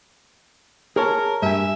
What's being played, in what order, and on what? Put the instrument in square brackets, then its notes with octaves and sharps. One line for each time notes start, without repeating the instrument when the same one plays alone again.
[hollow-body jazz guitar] G#4 C#5 A5 [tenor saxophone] A#4
[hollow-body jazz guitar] G2 G#5 [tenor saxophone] E5